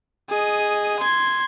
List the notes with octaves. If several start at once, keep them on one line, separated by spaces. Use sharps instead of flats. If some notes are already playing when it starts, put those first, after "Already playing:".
G#4 D#5
C6 G#6